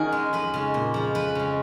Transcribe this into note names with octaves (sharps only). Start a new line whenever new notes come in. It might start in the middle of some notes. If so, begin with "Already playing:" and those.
Already playing: D#3 C#4 F#4 G#4 A#4
G#3
F2 B4
C#3 G#3
A#2
F3 G#3
F2 B4
C#3 G#3